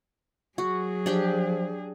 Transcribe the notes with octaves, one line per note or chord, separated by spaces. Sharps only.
F#3 F#4 G#4
F3 D4 G4 G5